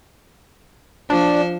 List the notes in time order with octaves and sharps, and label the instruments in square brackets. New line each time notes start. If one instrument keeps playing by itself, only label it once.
[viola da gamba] F3 C5 [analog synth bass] D4